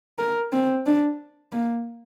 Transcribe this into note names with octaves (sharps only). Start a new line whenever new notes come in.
A#4
C4
D4
A#3